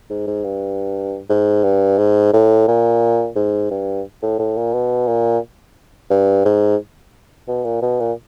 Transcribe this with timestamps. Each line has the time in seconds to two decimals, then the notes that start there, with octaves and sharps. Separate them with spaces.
0.10 G#2
0.27 G#2
0.44 G2
1.29 G#2
1.64 G2
1.98 G#2
2.33 A2
2.68 A#2
3.36 G#2
3.71 G2
4.23 A2
4.39 A2
4.57 A#2
4.73 B2
5.08 A#2
6.10 G2
6.45 G#2
7.48 B2
7.65 A#2
7.82 B2
8.00 A#2